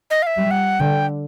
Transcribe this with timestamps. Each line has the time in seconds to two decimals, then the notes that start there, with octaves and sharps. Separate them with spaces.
0.11 D#5
0.22 F5
0.27 E5
0.37 G3
0.51 F#5
0.80 D3 G5